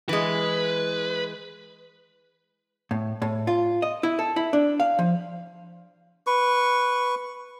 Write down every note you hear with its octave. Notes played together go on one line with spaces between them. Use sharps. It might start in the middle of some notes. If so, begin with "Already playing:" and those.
E3 G#3 B4
A2
A2
F4
D#5
E4
A4
E4
D4
F5
F3
B4 C#6